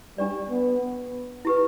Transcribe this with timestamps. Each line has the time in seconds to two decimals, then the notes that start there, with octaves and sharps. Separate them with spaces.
0.18 G3 D4 G4 D5
0.50 B3
1.45 E4 G4 B4